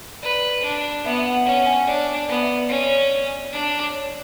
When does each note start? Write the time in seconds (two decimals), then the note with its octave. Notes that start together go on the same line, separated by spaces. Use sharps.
0.23 B4 D5
0.63 D4
1.05 B3 E5
1.18 E5
1.25 F#5
1.46 C#4 F#5
1.60 F#5
1.66 G#5
1.87 D4 D5
2.15 D5
2.29 B3
2.42 E5
2.69 C#4
3.46 C#5
3.52 D4 D5
3.93 C#5